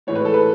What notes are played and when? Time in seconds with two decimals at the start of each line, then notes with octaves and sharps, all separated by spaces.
0.07 A2 E3 G#3 C#5
0.15 B4
0.25 A4
0.34 B4